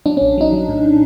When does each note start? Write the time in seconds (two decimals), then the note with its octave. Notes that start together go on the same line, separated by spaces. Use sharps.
0.06 F#3 D4
0.17 A#1 C#4
0.38 F#3 D#4
0.52 F#3
0.69 A2